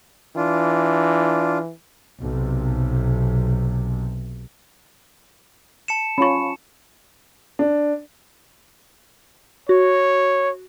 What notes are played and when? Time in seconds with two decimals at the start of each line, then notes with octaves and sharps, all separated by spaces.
0.36 E3 D4 F4
2.18 B1 C3
5.88 A5 C#7 E7
6.18 C#4 F4 B5 C#6
7.59 D4
9.69 F#4 C#5